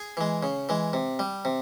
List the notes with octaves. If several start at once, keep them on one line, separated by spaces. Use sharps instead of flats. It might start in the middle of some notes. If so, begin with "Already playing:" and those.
Already playing: G#4 G#5
E3 G#3
C#3
E3 G#3
C3
G3
C3